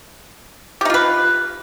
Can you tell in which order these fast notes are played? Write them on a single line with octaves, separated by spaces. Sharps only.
G4 D#4 F4 B4